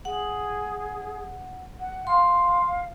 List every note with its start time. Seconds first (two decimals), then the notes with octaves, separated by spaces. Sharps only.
0.05 G#4 F#5
1.79 F#5
2.07 F5 C6